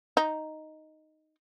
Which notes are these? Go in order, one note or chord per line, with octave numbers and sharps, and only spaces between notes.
D#4